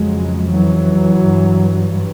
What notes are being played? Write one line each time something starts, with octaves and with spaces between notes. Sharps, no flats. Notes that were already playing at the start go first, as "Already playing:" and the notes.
Already playing: F2 C#3 F#3 G#3
E3 F#3
G2